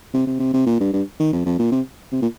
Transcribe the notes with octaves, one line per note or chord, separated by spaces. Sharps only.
C3
C3
C3
C3
A#2
G2
G2
D#3
F2
F2
A#2
C3
C3
A#2